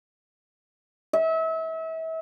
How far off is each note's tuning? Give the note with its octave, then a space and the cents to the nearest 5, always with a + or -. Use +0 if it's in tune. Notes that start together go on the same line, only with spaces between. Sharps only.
E5 -35